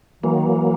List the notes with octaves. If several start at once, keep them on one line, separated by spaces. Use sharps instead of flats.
E3 F#3 A#3
D#3
E3